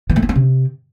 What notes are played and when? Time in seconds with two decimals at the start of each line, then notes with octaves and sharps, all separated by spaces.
0.10 E3
0.16 A3
0.23 B3
0.29 C#4
0.35 C3